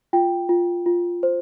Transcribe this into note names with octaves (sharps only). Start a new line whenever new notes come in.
F4 G5
F4
F4
C5